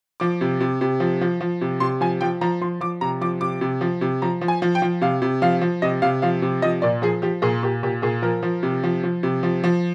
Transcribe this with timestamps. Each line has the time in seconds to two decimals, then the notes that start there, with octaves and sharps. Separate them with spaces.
0.20 F3 D6
0.41 C3
0.61 C3
0.81 C3
1.00 F3
1.21 F3
1.41 F3
1.61 C3
1.80 C3 C6
2.01 F3 G#5
2.21 F3 G5
2.41 F3 A#5
2.61 F3 C6
2.81 F3 D6
3.01 C3 A#5
3.21 F3 D6
3.41 C3 D6
3.61 C3
3.81 F3
4.01 C3
4.22 F3 A#5
4.41 F3
4.48 G#5
4.62 F3
4.75 G5
4.82 F3
5.01 C3 F5
5.22 C3
5.42 F3 F5
5.61 F3
5.82 C3 D#5
6.02 C3 F5
6.22 F3 F5
6.42 C3
6.62 F3 D#5
6.82 A#2 D5
7.02 F3 G#4
7.22 F3 G4
7.42 A#2 G#4
7.63 A#2 G4
7.83 A#2 G4
8.02 A#2 G#4
8.22 F3 A#4
8.43 F3
8.63 C3
8.83 F3
9.03 F3
9.23 C3
9.43 F3
9.64 F3